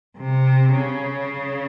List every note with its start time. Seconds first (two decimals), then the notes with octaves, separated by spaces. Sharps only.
0.17 C3
0.73 C#3